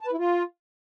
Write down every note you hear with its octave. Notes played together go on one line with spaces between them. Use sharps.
A5
B4
E4
F4